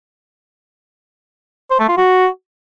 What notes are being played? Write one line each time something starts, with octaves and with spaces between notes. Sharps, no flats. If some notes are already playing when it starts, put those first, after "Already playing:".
C5
A3
F4
F#4